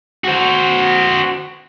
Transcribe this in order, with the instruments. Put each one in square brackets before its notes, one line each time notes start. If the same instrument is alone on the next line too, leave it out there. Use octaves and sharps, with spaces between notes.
[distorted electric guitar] F#4 C5